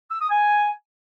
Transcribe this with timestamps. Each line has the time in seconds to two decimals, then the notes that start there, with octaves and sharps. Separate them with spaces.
0.11 E6
0.20 D#6
0.30 G#5